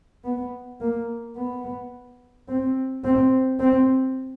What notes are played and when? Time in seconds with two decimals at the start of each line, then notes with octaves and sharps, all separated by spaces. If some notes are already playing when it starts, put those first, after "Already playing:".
0.25 B3
0.80 A#3
1.37 B3
2.48 C4
3.04 C4
3.60 C4